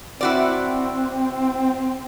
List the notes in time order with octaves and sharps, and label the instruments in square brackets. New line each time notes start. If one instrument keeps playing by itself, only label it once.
[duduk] C4 [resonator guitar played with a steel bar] E4 F#4 D5